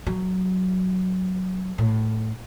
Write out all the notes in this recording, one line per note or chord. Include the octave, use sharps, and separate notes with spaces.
F#3
A2